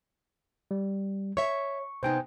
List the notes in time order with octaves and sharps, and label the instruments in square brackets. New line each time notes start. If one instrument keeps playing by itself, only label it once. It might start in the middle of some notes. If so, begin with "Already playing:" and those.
[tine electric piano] G3
[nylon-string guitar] C#5 E5 [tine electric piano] C#6
[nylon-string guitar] C3 B3 D#4 [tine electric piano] C5 G5 G#5